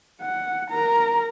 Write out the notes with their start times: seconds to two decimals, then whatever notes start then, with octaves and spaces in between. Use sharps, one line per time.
0.22 F#5
0.70 A#4 A#5